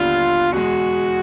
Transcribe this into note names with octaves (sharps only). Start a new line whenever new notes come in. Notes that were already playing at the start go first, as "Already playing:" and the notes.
Already playing: D#2 D3 G3 B3 D4 F4
E2 B2 G#3 F#4